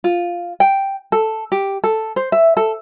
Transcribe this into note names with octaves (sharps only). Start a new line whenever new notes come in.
F4
G5
A4
G4
A4
C5
E5
A4